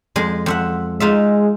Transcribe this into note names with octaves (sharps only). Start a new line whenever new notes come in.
F2 G#3
F2 E5 F#5
G#3 D#4 F4 E5